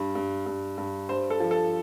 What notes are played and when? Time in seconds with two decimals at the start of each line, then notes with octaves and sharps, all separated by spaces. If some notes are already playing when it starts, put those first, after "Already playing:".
Already playing: G2
0.15 G2
0.46 G2
0.78 G2
1.09 G2 C5
1.30 A4
1.40 F3
1.51 A4